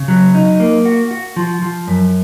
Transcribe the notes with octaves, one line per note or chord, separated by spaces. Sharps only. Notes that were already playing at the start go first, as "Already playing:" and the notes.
Already playing: C#3
F#3
D#4
A#3
F#4
F#4
F3
F3
F#2